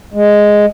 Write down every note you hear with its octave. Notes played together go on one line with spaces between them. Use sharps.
G#3